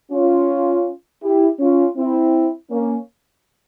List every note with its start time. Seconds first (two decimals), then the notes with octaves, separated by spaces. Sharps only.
0.11 C#4 F4
1.22 E4 G4
1.59 C#4 F4
1.96 C4 E4
2.70 A#3 C#4